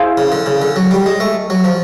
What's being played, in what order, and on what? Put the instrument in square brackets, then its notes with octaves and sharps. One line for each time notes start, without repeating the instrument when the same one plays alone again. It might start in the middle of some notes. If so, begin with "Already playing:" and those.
Already playing: [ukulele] E4 G#4 C5 F5
[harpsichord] C#3
D3
C#3
D3
F#3
G3
G#3
A3
F#3
F3